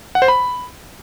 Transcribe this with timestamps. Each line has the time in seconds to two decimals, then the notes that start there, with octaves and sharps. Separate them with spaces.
0.15 F#5
0.22 C5
0.28 B5